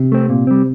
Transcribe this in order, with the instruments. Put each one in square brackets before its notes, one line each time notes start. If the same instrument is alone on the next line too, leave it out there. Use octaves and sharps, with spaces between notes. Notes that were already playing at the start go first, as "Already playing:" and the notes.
Already playing: [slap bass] C3
[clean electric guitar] A3 C4
A#2
G3 C4